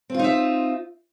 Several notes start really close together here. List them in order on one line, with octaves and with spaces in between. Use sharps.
C4 F4 D#4 E5